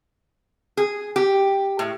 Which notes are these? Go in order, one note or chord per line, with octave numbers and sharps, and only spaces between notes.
G#4
G4
A2